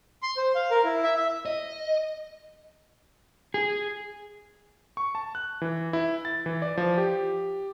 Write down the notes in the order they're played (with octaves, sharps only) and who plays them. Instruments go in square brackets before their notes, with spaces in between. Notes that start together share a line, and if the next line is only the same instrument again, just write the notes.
[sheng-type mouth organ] C6
C5
F5
A#4
E4
E5
E5
[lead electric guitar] D#5
[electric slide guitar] G#4
[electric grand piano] C#6
A5
F#6
E3
E4
A6
E3
D5
F3
G4